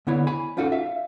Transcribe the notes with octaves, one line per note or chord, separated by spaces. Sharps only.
D3 B3 E4 C#5
G#5 B5
C#4 D#4 F4 F#4 A4
E5 F5